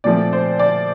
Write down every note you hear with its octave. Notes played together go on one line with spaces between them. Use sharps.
A#2 F3 A3 C4 D5
C5
D5